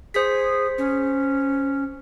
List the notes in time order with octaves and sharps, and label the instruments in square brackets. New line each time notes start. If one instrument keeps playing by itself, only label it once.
[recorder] G#4 [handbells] C5 B6
[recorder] C#4